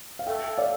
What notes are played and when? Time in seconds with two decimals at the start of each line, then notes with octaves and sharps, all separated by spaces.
0.19 F5
0.27 A4 E5 G5
0.58 D5 F5